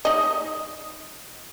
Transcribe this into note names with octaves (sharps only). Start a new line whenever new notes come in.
D#4 D#5